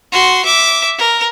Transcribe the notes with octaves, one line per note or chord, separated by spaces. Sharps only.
F#4 C6
E5 D6
A#4